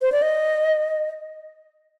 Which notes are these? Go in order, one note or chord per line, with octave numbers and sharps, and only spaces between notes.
C5
D5
D#5